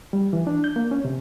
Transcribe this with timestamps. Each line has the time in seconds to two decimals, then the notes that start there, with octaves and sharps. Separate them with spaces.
0.13 G3
0.33 E3
0.47 D4
0.64 G6
0.76 A#3
0.91 C#4
1.05 C3